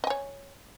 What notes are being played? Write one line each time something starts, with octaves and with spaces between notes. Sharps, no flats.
C#5 D#5 G#5